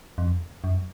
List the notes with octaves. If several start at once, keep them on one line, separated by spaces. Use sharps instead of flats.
F2
F#2